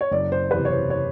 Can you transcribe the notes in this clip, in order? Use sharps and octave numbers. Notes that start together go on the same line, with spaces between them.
C#5
F#1 D5
C5
E2 C3 B4
C#5
C5
C#5